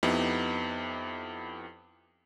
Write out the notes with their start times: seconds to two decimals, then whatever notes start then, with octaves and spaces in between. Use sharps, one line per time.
0.03 F2 B3 D#4 E4 G4